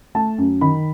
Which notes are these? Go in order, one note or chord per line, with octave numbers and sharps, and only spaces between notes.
A3 A5
F#2
D#3 B5